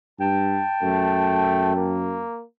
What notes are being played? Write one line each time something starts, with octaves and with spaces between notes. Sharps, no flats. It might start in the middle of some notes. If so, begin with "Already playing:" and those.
G2 G5 A5
F#2 A3
A#3